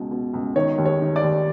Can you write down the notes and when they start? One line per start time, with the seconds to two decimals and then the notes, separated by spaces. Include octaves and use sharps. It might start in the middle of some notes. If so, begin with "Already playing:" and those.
Already playing: C#2 B2
0.11 B2
0.34 C#2
0.56 D#3 C#5
0.78 D#2
0.85 C#5
1.01 D#3
1.16 D5
1.23 D#2